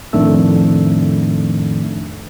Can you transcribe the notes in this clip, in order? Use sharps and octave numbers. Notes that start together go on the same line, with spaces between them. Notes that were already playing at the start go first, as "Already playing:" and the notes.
F2 A2 D#3 A3 D4 E6